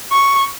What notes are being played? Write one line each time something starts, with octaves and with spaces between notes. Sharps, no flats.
C#6